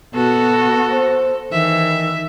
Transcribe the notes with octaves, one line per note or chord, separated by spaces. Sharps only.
B2 B3 F#4 A4
C5
D#3 E3 E5